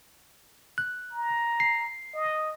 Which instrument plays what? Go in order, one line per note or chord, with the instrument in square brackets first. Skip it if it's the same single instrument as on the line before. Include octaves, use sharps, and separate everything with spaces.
[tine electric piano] F#6
[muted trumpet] A#5
[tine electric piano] C7
[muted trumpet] D#5